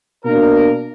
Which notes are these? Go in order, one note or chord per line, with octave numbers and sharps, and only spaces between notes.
B2 A#3 D4 A#4